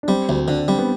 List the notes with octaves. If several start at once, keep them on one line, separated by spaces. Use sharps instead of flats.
D4
G3 C4
D2
D3 D4
G3 C4
B3